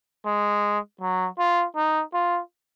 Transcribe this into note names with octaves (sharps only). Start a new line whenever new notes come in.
G#3
F#3
F4
D#4
F4